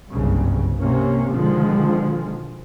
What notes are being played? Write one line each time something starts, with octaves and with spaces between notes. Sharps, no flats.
F#1 C2 G2 C#3
C3 A#3 C#4
B2 D3 D#3 F3 G#3